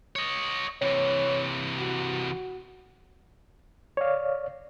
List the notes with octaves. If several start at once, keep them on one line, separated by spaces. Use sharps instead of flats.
C#5 D#5
C3 E3 C#5
F#4
C#5 D5 F5